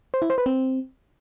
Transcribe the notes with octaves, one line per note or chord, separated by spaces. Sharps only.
C5
E4
C5
B4
C4